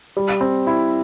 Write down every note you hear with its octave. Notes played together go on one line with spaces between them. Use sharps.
G3
C4
E4